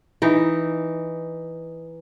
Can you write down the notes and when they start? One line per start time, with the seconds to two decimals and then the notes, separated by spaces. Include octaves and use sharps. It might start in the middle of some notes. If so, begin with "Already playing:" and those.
0.22 E3 D#4